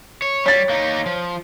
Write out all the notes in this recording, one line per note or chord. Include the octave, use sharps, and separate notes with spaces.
C#5
G3 C#5 A6
A#3 D#4
F3